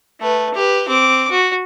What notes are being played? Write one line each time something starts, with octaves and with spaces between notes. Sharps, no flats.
A3 B4
G4 B4
C4 D6
F#4